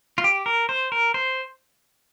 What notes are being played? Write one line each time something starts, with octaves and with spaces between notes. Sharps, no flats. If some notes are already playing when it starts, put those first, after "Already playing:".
F4
G4
A#4
C5
A#4
C5